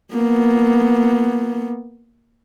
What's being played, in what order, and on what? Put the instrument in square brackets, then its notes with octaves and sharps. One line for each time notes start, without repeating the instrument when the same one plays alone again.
[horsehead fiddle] A#3 B3